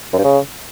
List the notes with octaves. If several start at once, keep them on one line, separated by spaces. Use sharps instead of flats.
F#2
G2
C#3